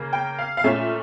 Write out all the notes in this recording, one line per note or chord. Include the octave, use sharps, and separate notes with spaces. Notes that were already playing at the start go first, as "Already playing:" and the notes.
Already playing: C#3 A#3
G5
F5
F5
A#2 A3 C#4 E5